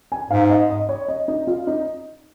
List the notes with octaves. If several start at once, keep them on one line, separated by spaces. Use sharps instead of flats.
G#5
G#2 F5
D#5
D#5
C#5
D#5
D#4
F4
D#4